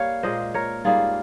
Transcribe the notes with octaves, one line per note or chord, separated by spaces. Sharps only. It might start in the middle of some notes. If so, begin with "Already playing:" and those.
Already playing: G3 A#3 C#5 F5
A#2 G#3 C5 D#5
A#4 C#5
G#2 G3 A#3 F4 G#4